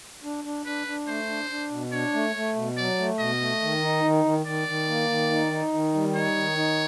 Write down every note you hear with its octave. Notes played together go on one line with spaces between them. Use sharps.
D4
D4
D4 B4
D4
A3 C5
D4
D4
B2
D4 C#5
A3
A3
B2
F#3 D5
A3
B2 D#5
A3
D#3
D#4
D#3
D#3
D#3 D5
D#3
A#3
D#3
D#4
D#4
D#3
G3
D#4 C#5
D#3
D#4